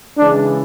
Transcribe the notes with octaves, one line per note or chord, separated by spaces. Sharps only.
C#3 E3 G#3 D4